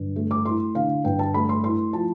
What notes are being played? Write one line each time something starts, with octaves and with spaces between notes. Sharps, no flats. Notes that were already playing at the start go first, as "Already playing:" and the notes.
Already playing: G2 D3
A3
D6
E4 C6
D3 F5
G2 G5
A5
A3 B5
C6
E4 C6
F3 A5